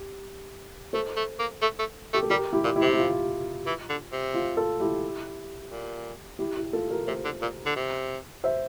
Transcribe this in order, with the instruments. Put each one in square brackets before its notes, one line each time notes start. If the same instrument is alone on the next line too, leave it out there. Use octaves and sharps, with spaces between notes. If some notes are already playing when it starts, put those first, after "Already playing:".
Already playing: [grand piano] G4
[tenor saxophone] A3 [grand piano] A4 C5
[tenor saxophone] A3
A#3
A3
A3
[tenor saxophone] A3 [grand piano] G4
[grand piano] A4
[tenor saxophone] G3 [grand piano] G4 A#4
[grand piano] E4 G4
[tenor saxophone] A#2
[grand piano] E4 G4
[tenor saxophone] C3
[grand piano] G4
F4
[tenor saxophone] E3
D3
C3
[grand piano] F4
F4 A4
E4 G4
[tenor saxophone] A#2
[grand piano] E4 G4
E4 G4
F4 A4
G4 A#4
[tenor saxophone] C3 [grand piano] A4 C5
[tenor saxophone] D3
A#2
D3
C3
[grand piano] C5 E5